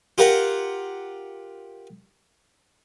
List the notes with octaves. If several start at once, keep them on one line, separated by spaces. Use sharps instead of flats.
F4 G4 A#4 F#5